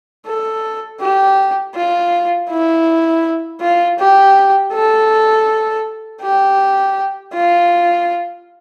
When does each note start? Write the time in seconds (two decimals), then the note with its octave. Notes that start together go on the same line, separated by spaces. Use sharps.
0.26 A4
1.01 G4
1.75 F4
2.50 E4
3.61 F4
3.99 G4
4.73 A4
6.22 G4
7.34 F4